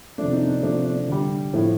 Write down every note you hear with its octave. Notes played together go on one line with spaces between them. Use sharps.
C3 F3 A3 D4
D#4
D4
C3 F3 A3 D4
D4
D3 G3
A2 F3 A3